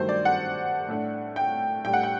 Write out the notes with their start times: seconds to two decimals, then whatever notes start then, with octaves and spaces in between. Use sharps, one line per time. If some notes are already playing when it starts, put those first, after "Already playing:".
Already playing: G2 D#3 F#3 A3 C5
0.09 D5
0.25 F#5
0.88 A2 A3 D4
1.36 G5
1.84 A2 G3 D4 G5
1.93 F#5
2.03 G5